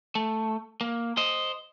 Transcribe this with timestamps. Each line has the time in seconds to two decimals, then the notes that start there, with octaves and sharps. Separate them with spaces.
0.15 A3
0.81 A#3
1.17 C5 D#5